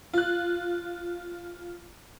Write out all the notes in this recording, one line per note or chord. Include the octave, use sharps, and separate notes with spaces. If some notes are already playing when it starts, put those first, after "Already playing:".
F4 F#6